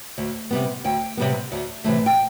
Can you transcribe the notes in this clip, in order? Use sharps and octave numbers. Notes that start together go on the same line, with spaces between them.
D2
C3 G3 B3
D2 G5
C3 G3 B3
D2
C3 E3 A3
G5